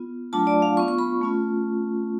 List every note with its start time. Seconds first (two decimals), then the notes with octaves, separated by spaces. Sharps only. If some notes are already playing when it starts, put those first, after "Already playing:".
Already playing: B3 F4
0.33 F#3 A3 D4 F4 A5
0.47 D5
0.62 F5
0.77 B3 F4 C#6
0.88 C#6
0.99 B5
1.21 A3 C#4 F4